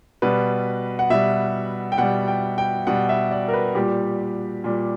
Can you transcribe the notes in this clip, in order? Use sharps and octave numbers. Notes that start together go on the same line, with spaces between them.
B2 G3 B4
F#5
B2 G3 E5
G5
B2 G3 F#5
G5
G5
B2 G3 F#5
E5
D5
A#4
B4
A#2 G3 G4
A#2 G3